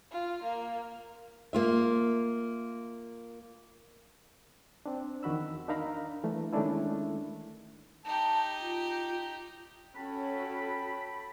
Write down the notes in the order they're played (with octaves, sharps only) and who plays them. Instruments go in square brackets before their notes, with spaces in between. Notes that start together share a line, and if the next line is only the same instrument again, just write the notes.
[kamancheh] F4
A#3
[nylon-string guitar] A#3 F4 E5
[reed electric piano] C4 D4
E2 D#3 F#4 B5 E6
D4 D#4 A#4 F5 A#5 B5
E3 A3 D4
D#3 G#3 A3 C#4 D4 E4
[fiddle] D#4 G4 [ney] A5
[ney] F4
[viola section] C#4 F#4 A4 [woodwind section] G5 A5 B5